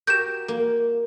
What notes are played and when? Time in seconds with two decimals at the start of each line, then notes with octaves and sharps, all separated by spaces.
0.07 F#4 G4 A#4 G6 E7
0.48 A#3